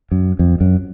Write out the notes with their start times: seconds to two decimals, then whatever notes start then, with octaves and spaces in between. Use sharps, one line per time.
0.11 F#2
0.39 F2
0.61 F#2